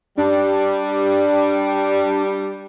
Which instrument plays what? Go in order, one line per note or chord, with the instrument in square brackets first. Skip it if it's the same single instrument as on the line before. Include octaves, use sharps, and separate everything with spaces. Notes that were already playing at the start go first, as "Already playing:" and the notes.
[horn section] G3 [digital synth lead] D4